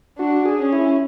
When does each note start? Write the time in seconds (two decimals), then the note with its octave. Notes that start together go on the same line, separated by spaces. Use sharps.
0.18 D4 F#4
0.45 G#4
0.59 C#4
0.73 E4